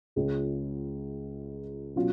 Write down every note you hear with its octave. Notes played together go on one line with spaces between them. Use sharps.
C#2 C#3 G#3 C#4 F4
B2 F#3 C#4 F4